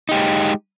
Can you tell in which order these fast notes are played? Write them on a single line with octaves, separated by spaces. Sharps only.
D#4 G4 G#3